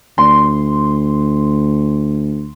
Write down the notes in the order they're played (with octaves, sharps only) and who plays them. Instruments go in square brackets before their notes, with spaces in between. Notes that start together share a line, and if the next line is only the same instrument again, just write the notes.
[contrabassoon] D2 [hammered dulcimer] C6